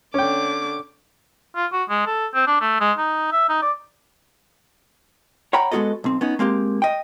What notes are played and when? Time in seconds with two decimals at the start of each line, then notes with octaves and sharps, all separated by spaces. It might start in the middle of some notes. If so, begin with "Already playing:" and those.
0.14 D3 C#4 G5 D6
1.56 F4
1.72 F#4
1.90 G#3
2.06 A4
2.35 C4
2.47 D4
2.61 A3
2.80 G#3
2.98 D#4
3.32 E5
3.49 D#4
3.62 D5
5.53 C#5 F#5 G5 A#5 B5
5.71 G#3 B3 F4 F#4 A4 D#5
6.04 B1 C4
6.21 B3 C#4 D#4
6.39 G#3 A#3 C4 G4
6.82 D#5 G5